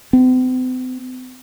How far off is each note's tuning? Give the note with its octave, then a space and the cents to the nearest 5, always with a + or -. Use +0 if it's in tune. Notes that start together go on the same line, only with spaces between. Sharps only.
C4 -45